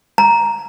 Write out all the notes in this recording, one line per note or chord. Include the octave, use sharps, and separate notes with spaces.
A#5